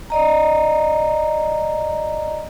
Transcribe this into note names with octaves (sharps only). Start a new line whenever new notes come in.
D5 D#5 A#5